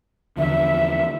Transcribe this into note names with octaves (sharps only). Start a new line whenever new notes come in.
E2 D3 F3 E5